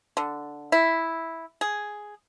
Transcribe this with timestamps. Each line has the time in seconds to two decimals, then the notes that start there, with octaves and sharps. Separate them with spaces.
0.17 D3
0.72 E4
1.61 G#4